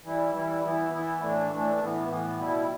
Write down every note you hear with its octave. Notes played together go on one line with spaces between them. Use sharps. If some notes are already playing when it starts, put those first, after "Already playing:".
E3 G3 E4
E3 G3 E4
E3 B3 E4
E3 B3 E4
A2 E3 A3 D4
A2 E3 A3 D4
A2 E3 B3
A2 E3 B3
B2 G3 E4